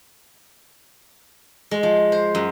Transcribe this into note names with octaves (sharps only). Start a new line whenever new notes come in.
G#3
F3
C5
F#2